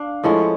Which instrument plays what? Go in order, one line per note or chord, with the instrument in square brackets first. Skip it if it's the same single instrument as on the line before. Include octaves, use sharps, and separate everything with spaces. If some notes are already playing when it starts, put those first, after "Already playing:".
Already playing: [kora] D4 [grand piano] F5
[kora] A2 F3 G#3 C#4 [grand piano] A4